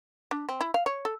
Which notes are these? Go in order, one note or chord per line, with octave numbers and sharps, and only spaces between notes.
D4
C4
E4
F5
C#5
A4